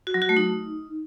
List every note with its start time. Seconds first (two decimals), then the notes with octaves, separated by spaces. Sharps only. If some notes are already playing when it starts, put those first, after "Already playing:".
0.07 F#4
0.14 F#3
0.22 F#4
0.29 A3
0.37 D#4